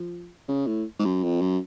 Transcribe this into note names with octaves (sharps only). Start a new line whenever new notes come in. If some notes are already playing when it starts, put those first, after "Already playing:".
Already playing: F3
C#3
A2
G#2
F#2
F2
F#2